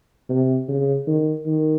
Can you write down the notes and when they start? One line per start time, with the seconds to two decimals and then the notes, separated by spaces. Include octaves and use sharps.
0.29 C3
0.68 C#3
1.07 D#3
1.46 D#3